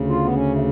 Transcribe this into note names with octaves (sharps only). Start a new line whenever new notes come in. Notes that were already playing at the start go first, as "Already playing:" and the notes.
Already playing: D2 C#3
F4
B3
C#4
A3